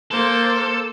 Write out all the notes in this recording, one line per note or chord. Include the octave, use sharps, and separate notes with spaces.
A#3 A4 C5